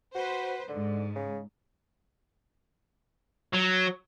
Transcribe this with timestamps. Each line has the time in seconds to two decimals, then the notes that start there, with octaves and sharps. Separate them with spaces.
0.15 F#4 B4 C5
0.68 G#2 D3
1.15 C#3
3.53 F#3